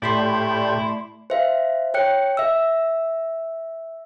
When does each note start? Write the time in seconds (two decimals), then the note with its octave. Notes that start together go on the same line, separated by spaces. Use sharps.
0.02 A2 A3 E4 G4 D5 B5 C6
1.30 C5 E5 F5
1.94 C#5 G5 F#6 C#7
2.37 E5 E6